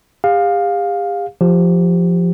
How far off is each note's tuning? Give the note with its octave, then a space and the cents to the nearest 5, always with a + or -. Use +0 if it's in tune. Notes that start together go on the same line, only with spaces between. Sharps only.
G4 +45 F5 +15
F3 +0 G4 +0